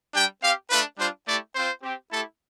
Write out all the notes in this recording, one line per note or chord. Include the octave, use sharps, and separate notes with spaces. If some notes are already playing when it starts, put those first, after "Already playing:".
G3 D4 G4 G5
C4 G4 F5
A3 D4 F4 B4
G3 D4 F4 C5
A3 E4 G4 D5
C4 F4 C5
C4 G4
A3 E4 G4 A4